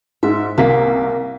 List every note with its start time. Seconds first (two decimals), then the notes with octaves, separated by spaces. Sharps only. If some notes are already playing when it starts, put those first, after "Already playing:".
0.23 G#2 E5
0.58 C2 C3 A#3 B6